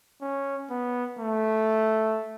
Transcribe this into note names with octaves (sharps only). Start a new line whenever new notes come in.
C#4
B3
A3